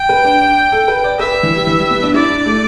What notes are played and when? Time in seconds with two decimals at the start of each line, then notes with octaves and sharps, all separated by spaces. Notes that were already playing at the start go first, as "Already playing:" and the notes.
Already playing: G5
0.09 B4
0.24 D4
0.41 D4
0.72 A4
0.88 B4
1.04 D5
1.19 B4 E5
1.43 E3
1.55 G3
1.67 E3
1.79 G3
1.91 B3
2.02 D4
2.14 E4 D5
2.30 D4
2.46 A3